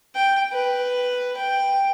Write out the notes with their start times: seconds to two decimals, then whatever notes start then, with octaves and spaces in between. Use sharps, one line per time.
0.15 G5
0.53 B4
1.37 G5